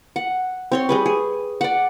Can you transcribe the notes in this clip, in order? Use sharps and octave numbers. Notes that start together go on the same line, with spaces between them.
F#5
C4 C#5 C6
G3 G#4 B4
G#4
D5 F#5